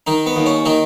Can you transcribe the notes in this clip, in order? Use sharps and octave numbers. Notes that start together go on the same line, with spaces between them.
D#3 D#4
B3
D#2
C#4
D#3 D#4